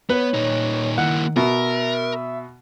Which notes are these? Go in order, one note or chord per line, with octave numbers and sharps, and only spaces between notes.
B3 B4 C#5
A#2 D#4
D#3 A#3 E4 F#5
B2 A#4 E5